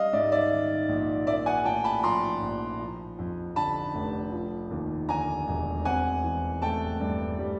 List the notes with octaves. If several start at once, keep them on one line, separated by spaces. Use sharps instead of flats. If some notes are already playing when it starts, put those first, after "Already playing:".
Already playing: G3 D#5 F5
G#2 D5 E5
D5 E5
D#3
A#1
A#3 D5 E5
F#5 G#5
A2 G5 A5
A5 B5
F3 A#5 C6
A#1
F3
F2
D3 A5 B5
F1
F3
D#2
D3 G#5 A#5
E1
C4 F#5 G#5
E3
A3 G5 A5
G2
G3